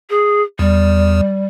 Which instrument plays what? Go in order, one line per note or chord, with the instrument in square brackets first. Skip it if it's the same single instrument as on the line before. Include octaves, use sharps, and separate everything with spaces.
[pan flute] G#4
[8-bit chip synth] E2 [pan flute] G3